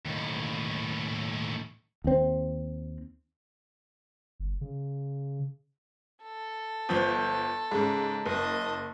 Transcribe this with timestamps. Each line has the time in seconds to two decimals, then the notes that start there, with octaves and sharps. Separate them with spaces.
0.05 D#2 A2
2.04 D#2 C4
4.40 G1
4.61 C#3
6.24 A4
6.89 G1 F3 G6
7.71 G#2 C#3
8.26 F#1 D#5 A5